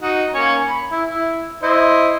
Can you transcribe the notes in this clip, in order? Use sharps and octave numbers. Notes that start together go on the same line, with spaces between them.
D#4 F#4
A#3 C#4 C#5
B5
E4
E4
E4 C5 D#5